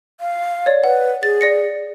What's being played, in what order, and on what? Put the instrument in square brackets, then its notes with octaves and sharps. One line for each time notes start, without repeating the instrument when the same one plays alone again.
[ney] F5
[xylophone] C#5 D5
[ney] B4 [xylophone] F#5
[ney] G#4 [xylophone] A6
[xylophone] D5 A#6 C#7